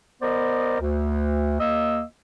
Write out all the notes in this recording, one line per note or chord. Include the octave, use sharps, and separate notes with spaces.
B3 A#4 C5 D5 D#5
D2
D#2 A#3 D#5 E6